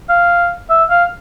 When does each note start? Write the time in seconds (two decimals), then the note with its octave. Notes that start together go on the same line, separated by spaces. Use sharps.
0.09 F5
0.70 E5
0.90 F5